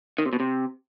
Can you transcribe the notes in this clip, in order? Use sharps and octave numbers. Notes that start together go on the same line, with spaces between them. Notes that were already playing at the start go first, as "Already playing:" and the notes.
D#3
C3
B2
C3